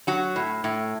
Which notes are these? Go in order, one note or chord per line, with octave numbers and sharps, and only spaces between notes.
F#3 F#4
A2
A2